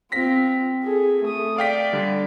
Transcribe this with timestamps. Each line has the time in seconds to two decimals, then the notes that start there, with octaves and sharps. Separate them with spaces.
0.12 C4 F4 A#6 B6
0.83 G#4 A4
1.22 A3 D#6
1.58 D5 F5 G5 B6
1.93 D3 G3